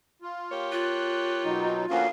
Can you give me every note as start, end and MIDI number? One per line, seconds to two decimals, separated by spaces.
0.22 0.72 65
0.51 1.77 58
0.51 1.77 67
0.51 1.77 73
0.72 2.05 65
0.72 1.44 90
1.45 1.86 47
1.45 1.86 54
1.45 1.86 63
1.90 2.09 38
1.90 2.09 53
1.90 2.07 58
1.90 2.07 61
1.90 2.07 66
1.90 2.09 77